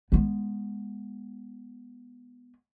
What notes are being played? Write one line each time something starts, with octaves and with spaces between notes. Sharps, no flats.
G#3 B3